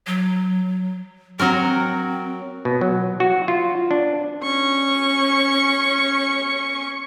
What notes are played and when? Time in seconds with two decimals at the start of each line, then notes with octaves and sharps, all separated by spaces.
0.07 F#3
1.39 F#3 C4 F#4 A#4
2.65 B2
2.81 F#3
3.20 F#4
3.48 F4
3.91 D4
4.43 C#4 C#6